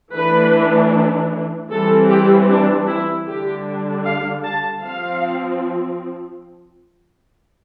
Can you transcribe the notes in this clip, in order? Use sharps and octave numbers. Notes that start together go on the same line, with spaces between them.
E3 A3 D4 B4
E3 G3 C4 A4
G4
D4
E4
D3 G3 D4 G4
F5
A5
F3 C4 F5